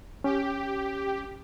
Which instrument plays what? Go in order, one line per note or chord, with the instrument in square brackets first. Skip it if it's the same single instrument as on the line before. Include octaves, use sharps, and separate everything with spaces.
[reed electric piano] C#4 [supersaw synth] G4